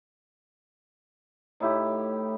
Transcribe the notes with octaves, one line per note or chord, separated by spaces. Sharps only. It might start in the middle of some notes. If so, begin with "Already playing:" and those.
A2 D#4 E4 G4